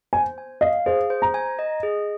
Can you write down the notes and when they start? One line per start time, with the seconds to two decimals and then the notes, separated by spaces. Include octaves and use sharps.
0.13 C5 G#5
0.38 G#5
0.61 D#5 F5
0.86 G#4 C5
1.10 C5
1.22 A#5
1.34 G#5
1.59 D#5
1.83 G#4